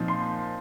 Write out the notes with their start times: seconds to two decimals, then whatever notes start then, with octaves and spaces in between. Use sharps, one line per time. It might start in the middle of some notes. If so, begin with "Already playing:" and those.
Already playing: A#2 F3 C4 D#4
0.08 C6